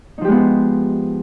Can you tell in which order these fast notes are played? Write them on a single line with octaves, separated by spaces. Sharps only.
D#4 F3 G4 G#3 B3